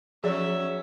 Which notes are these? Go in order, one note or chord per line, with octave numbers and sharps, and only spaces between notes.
F3 F#3 C#4 G#4 D5 E5